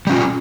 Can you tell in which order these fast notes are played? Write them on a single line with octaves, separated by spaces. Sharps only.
G3 C#4 F4